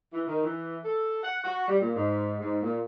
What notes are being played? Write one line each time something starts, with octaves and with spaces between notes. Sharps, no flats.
E3
D#3
E3
A4
F#5
F#4
G3
A#2
G#2
G#2
A#2